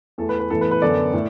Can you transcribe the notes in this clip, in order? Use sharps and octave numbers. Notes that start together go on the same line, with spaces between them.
E2 E3 A3 A4
B4
B4
A2 E3 B3 A4
B4
B4
F#2 D3 B3 A4 D5
A2